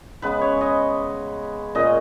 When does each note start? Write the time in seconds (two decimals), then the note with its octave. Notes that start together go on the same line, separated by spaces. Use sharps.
0.22 C#3 G#3 B3 B4
0.41 C#5
0.61 D#5
1.75 A#2 G#3 C#4 D#5